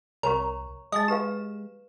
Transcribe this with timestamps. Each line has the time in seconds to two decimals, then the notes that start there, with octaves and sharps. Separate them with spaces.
0.23 C2 A#4 C#5 A#5 C#6
0.92 G#3 D#5 A5
1.08 G4 B4 F5 E7